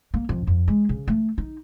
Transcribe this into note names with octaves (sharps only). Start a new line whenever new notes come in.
A#3
F2
F2
G#3
C#3
A3
D#4